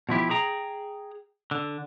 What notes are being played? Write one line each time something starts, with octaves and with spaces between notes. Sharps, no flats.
B2 F3 E4 G4
G#4 G5 A#5
D3